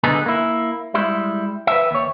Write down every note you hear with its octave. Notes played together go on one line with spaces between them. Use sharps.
D3 B3 D#4 G#4
A#3 E4
G3 G#3 E4
B4 E5
D#2 C#5